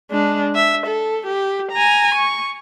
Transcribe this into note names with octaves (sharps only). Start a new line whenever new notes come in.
G#3 D4
E5
A4
G4
G#5 A#5
C#6